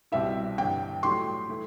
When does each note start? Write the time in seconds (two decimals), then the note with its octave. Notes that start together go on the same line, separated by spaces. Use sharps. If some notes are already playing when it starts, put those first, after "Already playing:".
0.12 C2 B2 G3 C4 E4 E5
0.58 G1 G2 E3 G5
1.03 A2 F#3 A3 E4 G4 C6
1.49 E3 A3 E4